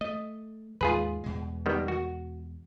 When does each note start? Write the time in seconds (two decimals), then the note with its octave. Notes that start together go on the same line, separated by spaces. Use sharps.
0.01 A3 D#5
0.81 D#2 G#2 G#3 F4 G#4 B4
1.24 E2 B2 G#3
1.66 D#3 G3 B3
1.88 F#4